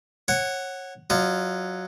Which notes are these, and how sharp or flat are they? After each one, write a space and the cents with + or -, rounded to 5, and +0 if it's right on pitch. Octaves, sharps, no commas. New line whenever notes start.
C#5 -20 F#5 +5
F#3 +0 F4 -5 D#5 -40